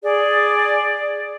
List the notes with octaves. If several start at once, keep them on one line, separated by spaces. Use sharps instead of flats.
G#4 D5